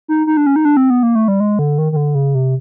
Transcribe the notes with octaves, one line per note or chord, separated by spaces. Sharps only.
D#4
D#4
D4
C#4
D#4
D4
C4
B3
A#3
A3
G3
G#3
D3
D#3
D#3
D3
C#3
C3